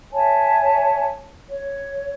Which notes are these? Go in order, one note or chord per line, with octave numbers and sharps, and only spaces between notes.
C#5 E5 G#5 A5
C#5